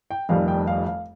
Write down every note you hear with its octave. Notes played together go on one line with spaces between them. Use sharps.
G5
F1 F2 D#3 G3 F5
G5
F5
F5